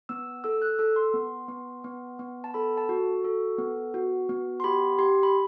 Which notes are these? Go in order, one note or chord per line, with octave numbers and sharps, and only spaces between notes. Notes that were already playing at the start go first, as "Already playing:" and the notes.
B3 E6
A4 E6
F#6
A4 E6
C6
B3
B3
B3
B3
A5
A4 B5
A5
F#4
A4
B3
F#4
B3
C6
G4 B5
G4 C6
B5